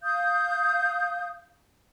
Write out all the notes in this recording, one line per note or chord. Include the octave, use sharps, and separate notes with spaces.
F5 D#6 G6